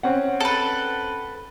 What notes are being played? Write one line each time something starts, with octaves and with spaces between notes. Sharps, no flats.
C4 C#4 F#5
A4 B4